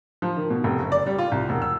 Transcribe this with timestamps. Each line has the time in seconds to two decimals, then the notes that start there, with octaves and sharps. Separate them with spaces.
0.22 F3
0.37 D#3
0.50 B2
0.64 F1
0.79 F#1
0.92 D5
1.06 G3
1.18 F4
1.32 C2
1.49 E1
1.62 E6